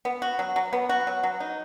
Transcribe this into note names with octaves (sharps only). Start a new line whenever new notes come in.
B3
F#4
F#3
F#3
B3
F#4
F#3
F#3
D#4